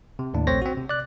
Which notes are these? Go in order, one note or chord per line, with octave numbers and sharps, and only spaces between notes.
C3
D#2 A2 D4
A#1 A3 C4 C5 C#5 A#6
C4 F#4
C3
D5 F#6